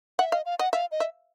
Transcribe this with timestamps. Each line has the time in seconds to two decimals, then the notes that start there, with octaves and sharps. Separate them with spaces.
0.19 E5 F#5
0.32 D#5 F5
0.45 F5
0.59 D#5 F#5
0.73 E5 F5
0.92 D#5
1.00 E5